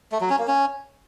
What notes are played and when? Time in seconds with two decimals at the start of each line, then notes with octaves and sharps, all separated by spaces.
0.12 A3
0.21 F#3
0.30 C#4
0.39 A#3
0.48 C#4